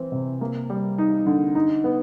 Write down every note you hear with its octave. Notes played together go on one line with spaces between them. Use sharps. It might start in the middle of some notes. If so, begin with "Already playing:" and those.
Already playing: E3 C4
C3
A#3
G3
D#4
D3
D#4
B3